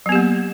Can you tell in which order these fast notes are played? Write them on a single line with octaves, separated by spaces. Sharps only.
F#3 B3 G4 A#3